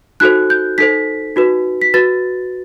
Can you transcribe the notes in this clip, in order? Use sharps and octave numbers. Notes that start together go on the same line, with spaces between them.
D#4 F#4 A4 C5 F#6
G6
D#4 A4 C5 B6
D#4 F#4 B4
B6
F#4 B4 A6